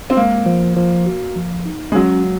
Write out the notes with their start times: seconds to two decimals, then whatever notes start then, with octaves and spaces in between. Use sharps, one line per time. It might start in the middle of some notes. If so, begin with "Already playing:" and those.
0.10 C4
0.17 G#3 A#3
0.46 F3
0.76 F3
1.06 F#4
1.36 F3
1.65 D#4
1.92 G#3
1.95 F#3 C#4